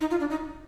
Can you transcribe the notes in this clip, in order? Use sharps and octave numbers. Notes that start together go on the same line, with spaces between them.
D#4
F4
D4
D#4